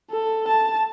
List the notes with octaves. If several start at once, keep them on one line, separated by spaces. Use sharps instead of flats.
A4
A5